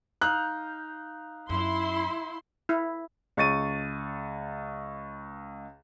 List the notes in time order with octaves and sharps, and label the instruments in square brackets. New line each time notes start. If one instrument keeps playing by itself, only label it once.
[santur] D#4 F5 [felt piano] F#6
[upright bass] F#2 [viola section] E4 C6
[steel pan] E4
[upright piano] C#2 C#6 A6 D#7